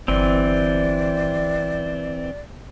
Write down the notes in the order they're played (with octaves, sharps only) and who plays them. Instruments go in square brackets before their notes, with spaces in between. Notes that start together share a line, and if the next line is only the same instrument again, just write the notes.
[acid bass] G1 [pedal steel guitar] E3 C4 [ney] D5